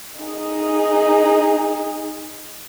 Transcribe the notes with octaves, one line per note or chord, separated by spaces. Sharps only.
D#4 G#4